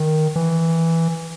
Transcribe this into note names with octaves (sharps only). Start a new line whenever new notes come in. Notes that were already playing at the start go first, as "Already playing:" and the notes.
Already playing: D#3
E3